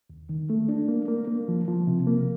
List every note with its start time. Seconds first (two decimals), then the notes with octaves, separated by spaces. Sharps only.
0.10 D#2
0.29 D#3
0.50 A3
0.69 D4
0.88 A#3
1.08 A#3
1.28 A#3
1.48 F3
1.68 F3
1.87 C3
2.07 A#3